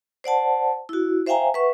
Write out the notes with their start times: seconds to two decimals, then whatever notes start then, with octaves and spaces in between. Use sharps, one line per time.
0.24 C5 D5 F#5 A5
0.89 E4 F#4
1.27 C5 E5 F5 G5 G#5 A#5
1.54 B4 E5 F#5 C#6